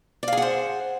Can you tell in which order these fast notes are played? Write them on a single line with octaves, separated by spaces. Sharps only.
D5 F5 G#4 F#5 C5